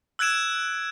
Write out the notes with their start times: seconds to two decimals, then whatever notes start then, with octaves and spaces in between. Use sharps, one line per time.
0.19 E6 F#6 G#6 D7 E7